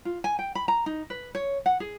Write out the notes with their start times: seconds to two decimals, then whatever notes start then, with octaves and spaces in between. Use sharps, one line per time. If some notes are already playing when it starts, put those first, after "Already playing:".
0.05 F4
0.24 G#5
0.39 G5
0.55 B5
0.68 A#5
0.86 D#4
1.10 B4
1.35 C#5
1.66 F#5
1.80 G#4